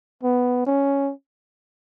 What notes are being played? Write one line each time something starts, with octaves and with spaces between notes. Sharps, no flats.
B3
C#4